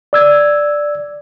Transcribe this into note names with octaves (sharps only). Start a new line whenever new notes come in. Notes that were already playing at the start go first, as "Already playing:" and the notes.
D5 E6 G#6